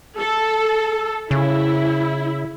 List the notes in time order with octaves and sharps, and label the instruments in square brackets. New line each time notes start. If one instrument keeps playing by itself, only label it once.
[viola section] A4
[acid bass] C#3 [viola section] E4